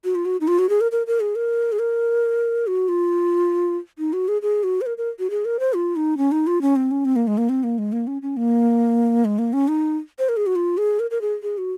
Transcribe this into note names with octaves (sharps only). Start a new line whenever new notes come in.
F#4
F4
F#4
D#4
F4
F#4
G#4
A#4
A#4
A#4
G#4
A#4
G#4
A#4
F#4
F4
D#4
F#4
G#4
G#4
F#4
C5
A#4
A#4
F#4
G#4
A#4
C5
F4
D#4
C#4
D#4
F4
C#4
C4
C#4
C4
A#3
G#3
A#3
C4
A#3
G#3
A#3
C#4
C#4
A#3
G#3
A#3
C#4
D#4
C5
A#4
G#4
F#4
F4
G#4
A#4
A#4
G#4
G#4
F#4